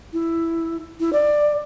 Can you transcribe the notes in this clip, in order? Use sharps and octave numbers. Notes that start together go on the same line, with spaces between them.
E4
E4
D5